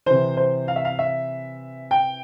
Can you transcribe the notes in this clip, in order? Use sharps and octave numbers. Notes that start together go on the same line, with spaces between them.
C3 E3 C5
C5
F5
E5
F5
E5
G5